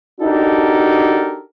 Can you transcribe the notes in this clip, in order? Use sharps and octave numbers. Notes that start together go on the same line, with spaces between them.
D4 D#4 F#4 G4 A4 A#4